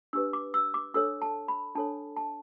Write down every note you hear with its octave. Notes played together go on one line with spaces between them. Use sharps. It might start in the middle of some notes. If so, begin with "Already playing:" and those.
D4 G4 B4 E6
D6
E6
D6
D4 A4 C#5 E6
A5
B5
D4 A4 C#5 A5
A5